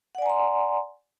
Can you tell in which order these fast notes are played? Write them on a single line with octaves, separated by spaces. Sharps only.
F#5 D5 G#5 A#5 C6